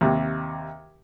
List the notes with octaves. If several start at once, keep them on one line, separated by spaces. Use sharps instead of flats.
D#2 C3